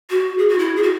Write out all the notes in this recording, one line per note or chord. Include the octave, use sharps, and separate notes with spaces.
F#4
G#4
F#4
E4
G#4
F#4